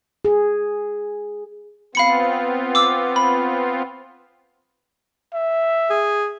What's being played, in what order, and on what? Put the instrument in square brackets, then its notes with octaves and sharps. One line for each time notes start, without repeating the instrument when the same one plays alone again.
[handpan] G#4
[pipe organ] B3 C4 F4 [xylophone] F5 B5 C#7
[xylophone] D6 E6
B5
[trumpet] E5
[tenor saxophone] G#4